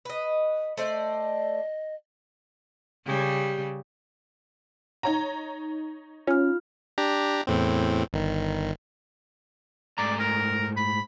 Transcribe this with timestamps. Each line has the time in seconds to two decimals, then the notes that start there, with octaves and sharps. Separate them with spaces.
0.05 B4 D#5
0.77 A3 C5 D5 D#5
3.06 C#3 G3 G4
5.03 D#4 C#5 A#5
6.27 C#4 F4 F6
6.98 D4 G4 A#5
7.47 E2 A2 C4
8.13 G1 D#3
9.98 G#2 A3 D5 A#5
10.19 A#4
10.77 B5